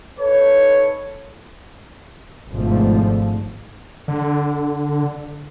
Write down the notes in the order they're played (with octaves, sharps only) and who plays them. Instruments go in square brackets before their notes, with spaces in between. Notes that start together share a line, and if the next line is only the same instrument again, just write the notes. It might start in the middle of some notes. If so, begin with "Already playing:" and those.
[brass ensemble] D#4 A4 B4 C#5
[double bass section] G#1 G#2 B2 D3 F3 A3
[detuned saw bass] D3